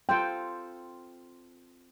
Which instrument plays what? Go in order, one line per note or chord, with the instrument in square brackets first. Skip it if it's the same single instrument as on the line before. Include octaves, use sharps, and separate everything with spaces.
[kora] C4 F4 A4 [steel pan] G5